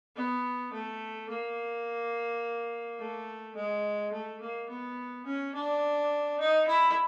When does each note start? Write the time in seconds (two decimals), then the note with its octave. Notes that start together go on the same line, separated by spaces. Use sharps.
0.16 B3
0.73 A3
1.29 A#3
2.99 A3
3.56 G#3
4.12 A3
4.41 A#3
4.69 B3
5.26 C#4
5.55 D4
6.40 D#4
6.68 E4